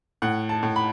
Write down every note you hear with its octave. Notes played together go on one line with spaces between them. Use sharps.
A2 F#5
A5
A2
B5